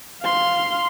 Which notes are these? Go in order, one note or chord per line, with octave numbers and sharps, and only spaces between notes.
F5 C6